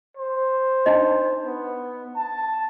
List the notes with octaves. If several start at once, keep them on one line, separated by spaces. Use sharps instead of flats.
C5
D4 D#4 D#5
B3
A5